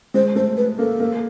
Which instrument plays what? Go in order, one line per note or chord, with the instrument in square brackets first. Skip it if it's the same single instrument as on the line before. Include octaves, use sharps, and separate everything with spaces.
[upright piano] G#3 [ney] C5
[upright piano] A3 [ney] C5
[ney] B4
[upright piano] A#3 [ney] A4
[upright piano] A#3